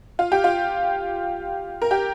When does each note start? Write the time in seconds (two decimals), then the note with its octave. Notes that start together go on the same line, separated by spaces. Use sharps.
0.19 F4
0.32 G4
0.44 F4
1.82 A#4
1.91 G4